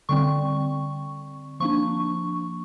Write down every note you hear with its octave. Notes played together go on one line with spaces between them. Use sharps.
D3 G3 C4 C#6
F3 A#3 D4 C#6